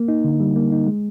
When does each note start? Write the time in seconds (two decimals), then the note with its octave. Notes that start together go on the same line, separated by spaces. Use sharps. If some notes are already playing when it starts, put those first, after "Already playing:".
Already playing: A#3
0.08 D#4
0.24 D3
0.40 G3
0.56 A#3
0.72 D#4
0.87 G#3